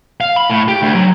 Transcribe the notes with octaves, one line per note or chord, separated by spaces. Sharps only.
F5
B5
A2
G4
D2
F#3